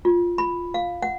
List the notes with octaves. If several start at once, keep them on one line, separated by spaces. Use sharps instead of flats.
F4
B5
F5
F#5